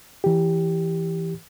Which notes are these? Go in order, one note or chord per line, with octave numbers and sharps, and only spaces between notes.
E3 G4